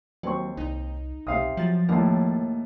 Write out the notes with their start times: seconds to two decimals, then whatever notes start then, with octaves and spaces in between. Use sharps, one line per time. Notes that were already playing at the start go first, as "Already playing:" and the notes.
0.23 D#2 F#3 C4 C#6
0.57 C2 D#4
1.27 B1 C3 F5 D#6
1.57 F3 F#3 A6
1.89 D#2 A2 A#3